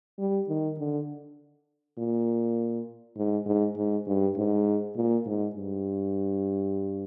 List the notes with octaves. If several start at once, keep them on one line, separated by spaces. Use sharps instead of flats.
G3
D#3
D3
A#2
G#2
G#2
G#2
G2
G#2
A#2
G#2
G2